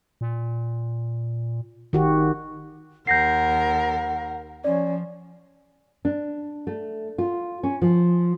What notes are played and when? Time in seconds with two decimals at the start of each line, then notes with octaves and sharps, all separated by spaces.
0.21 A#2
1.93 G#1 D#3 F#4 G4
3.07 D#2 A#4 F#5 G6 A#6 C7
4.64 F3 C#4 D5
6.05 D4
6.67 A3
7.18 F4
7.63 C#4
7.82 F3